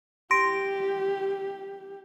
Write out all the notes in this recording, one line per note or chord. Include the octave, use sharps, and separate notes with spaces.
G4 C6 A#6 D7